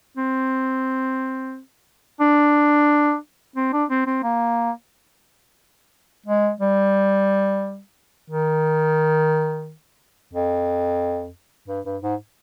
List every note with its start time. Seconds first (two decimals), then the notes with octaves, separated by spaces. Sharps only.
0.17 C4
2.20 D4
3.56 C4
3.73 D4
3.90 C4
4.06 C4
4.23 A#3
6.26 G#3
6.61 G3
8.30 D#3
10.33 F2
11.68 G2
11.85 G2
12.02 G#2